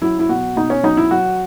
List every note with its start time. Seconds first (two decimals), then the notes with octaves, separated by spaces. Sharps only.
0.02 F#3 E4
0.19 E4
0.29 B2 F#4
0.56 B2 D#4
0.70 C#4
0.83 F#3 D#4
0.97 E4
1.11 F#3 F#4